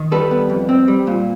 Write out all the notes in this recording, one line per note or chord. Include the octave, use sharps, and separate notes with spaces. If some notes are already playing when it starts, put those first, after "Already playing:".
Already playing: D#3
G3 A4 B4
B3
F2
C4
G3
A#2